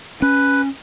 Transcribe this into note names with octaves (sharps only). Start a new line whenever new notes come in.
C#4 B4